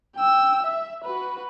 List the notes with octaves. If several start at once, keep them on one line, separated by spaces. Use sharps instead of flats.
G5 E6
E5
F#4 B4